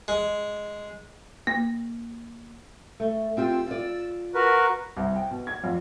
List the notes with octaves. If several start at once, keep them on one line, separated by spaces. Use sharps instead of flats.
G#3
A#3
A3
C4 F4 G4 E6
F4 D5
F#4 A#4 B4
C2
G5
B2
G#6
F2